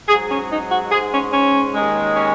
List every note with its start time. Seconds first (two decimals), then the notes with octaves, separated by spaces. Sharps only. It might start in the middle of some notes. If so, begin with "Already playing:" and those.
0.08 G#2 G#4
0.11 F#3
0.30 C#4
0.50 D#4
0.71 F#4
0.92 G#2 G#3 G#4
1.12 C#4
1.33 C#4
1.75 D#2 D#3 G#3
2.16 C#4